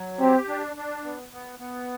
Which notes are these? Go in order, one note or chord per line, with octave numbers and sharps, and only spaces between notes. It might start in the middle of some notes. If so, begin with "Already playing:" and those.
Already playing: F#3
C4 G4
D4
D4
B3
B3
B3